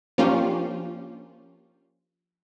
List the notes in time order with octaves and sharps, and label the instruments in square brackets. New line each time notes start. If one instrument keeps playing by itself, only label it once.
[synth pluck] F3 A#3 C#4 D4 F4 G4